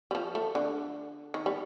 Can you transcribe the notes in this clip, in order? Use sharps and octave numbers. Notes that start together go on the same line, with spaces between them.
G3
F3
A3
D3
D#3
G3